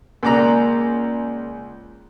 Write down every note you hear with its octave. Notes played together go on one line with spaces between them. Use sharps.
C#2 A#3 D5 A#5